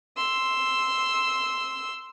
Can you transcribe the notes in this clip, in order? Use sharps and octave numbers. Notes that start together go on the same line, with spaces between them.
C6 E6